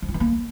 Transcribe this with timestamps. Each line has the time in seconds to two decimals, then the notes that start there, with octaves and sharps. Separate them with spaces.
0.02 F3
0.08 F4
0.14 E3
0.20 A#3